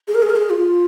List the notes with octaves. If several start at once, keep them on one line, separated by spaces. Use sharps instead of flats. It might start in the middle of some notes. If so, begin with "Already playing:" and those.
G#4
A#4
G#4
A#4
G#4
F4